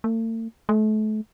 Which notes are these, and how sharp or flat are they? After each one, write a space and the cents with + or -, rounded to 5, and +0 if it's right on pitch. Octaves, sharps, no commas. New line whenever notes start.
A3 +45
A3 -35